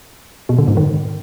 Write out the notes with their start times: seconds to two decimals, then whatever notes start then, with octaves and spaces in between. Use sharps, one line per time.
0.49 B2
0.59 D3
0.68 G#2
0.77 D#3